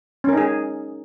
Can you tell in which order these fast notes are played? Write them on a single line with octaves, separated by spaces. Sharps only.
C#4 A#4 D#4 G#4